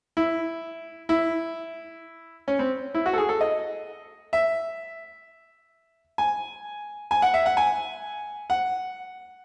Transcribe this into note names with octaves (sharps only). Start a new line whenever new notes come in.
E4
E4
C#4
C4
E4
F#4
A4
G#4
A4
D#5
E5
G#5
G#5
F#5
E5
F#5
G#5
F#5